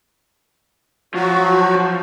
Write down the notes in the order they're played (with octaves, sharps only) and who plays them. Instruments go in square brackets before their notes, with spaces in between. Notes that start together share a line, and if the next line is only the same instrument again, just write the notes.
[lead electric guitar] F3 [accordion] F#3 F#4